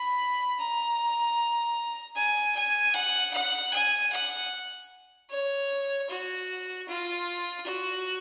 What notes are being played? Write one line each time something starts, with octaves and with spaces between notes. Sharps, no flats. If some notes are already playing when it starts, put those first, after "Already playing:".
Already playing: B5
A#5
G#5
G#5
F#5
F#5
G#5
F#5
C#5
F#4
F4
F#4